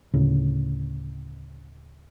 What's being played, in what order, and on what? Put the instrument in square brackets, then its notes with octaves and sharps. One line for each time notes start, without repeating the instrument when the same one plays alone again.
[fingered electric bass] D2 A2 C#3